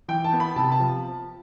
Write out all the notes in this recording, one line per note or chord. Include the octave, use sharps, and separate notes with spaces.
E3 G5
A5
B3
B5
C3 A5
A5
F3